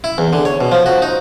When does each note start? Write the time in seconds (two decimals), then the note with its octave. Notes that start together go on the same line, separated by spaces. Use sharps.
0.04 E4
0.18 E2
0.33 D3
0.45 C#5
0.61 B2
0.72 F3
0.86 F#4
1.02 D#4